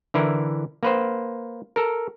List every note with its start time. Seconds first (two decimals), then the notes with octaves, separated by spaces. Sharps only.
0.14 D3 E3 E4 A#4
0.83 A#3 B4 C5
1.76 A4 A#4